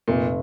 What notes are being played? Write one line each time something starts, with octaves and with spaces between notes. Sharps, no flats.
F1 A#2